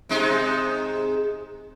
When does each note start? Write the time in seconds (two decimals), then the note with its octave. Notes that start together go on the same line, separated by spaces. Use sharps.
0.09 C3 G#3 D#4